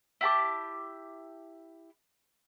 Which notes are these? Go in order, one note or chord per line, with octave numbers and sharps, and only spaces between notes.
E4 G4 A5 D6